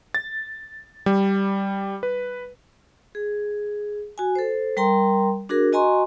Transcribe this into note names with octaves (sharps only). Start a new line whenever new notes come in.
A6
G3
B4
G#4
F#4 G#5
A4 C5
G3 A#4 G5 A#5 C6
D4 F#4 G#4 A#4
F#4 D#5 G#5 A#5 C6 C#6